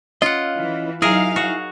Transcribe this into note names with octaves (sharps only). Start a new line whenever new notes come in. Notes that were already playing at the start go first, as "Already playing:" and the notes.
C#4 F4 D#5 F#5
E3
F#3 D#4 E4 G#4 A#4 E5 F5 G#5
F#4